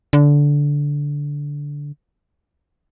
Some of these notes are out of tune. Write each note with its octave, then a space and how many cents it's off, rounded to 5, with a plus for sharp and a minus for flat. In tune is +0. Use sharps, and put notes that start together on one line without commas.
D3 -15